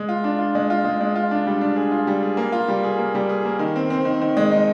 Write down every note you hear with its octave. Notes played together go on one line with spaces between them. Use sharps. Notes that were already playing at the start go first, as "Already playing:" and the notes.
Already playing: G#3
F4
D4
F4
G#3
F4
G#3
G#3
F4
D4
G3
D4
G#4
F4
G3
G#4
A#3
F4
G3
G#4
A#3
G3
G#4
A#3
D#3
C4
C4
D#3
D#3
G#3
D#4